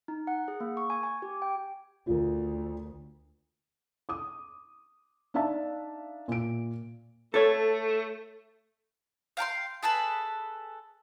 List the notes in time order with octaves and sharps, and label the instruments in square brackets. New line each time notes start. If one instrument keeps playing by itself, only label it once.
[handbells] D#4
F#5
G#4
A#3
C#6
G#5
G#5
G4
G5
[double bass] D2 [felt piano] F4 A#4
[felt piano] D6 D#6
D4 D#4 D5 E5 F5 A5
A#2 D7
[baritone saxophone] A3 [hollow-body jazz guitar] A4 C#5
[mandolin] F5 G5 A#5 C6
G#4 A4 B4 A5